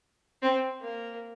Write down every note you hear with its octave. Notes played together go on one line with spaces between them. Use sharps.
C4
A#3